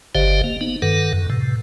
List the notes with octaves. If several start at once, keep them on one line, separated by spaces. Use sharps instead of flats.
G1 D3 G4 C5 D#5 F5
A#3
B3 D#4
G2 D#3 A4 B4 F#5
F#2
A2 C3